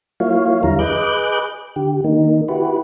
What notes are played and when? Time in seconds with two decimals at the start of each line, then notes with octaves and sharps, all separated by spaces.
0.20 F#3 A#3 E4 F4 C#5 F5
0.63 E2 D3 G3 E4 F5 A#5
0.79 G#4 B4 D#5 D6 F#6 G6
1.76 D3 G4
2.04 D#3 A#3 D#4
2.48 E4 F#4 G4 B4